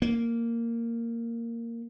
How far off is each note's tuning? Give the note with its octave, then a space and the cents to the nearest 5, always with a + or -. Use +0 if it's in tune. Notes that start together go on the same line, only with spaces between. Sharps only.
A#3 -10